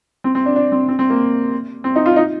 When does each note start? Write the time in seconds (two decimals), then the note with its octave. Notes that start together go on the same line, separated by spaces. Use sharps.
0.24 C4
0.35 C4
0.46 D4
0.56 D4
0.72 C4
0.89 C4
0.99 C4
1.10 A#3
1.84 C4
1.96 D#4
2.06 F4
2.16 D#4